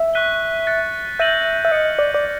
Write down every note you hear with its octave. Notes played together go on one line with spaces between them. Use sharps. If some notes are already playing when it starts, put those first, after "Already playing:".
Already playing: E5
C#6 F#6 B6 D#7 G7
F#6 A6 C#7
E5 G6 A#6 D#7 F#7
E5
D#5 F6 A6 C#7
D5
D5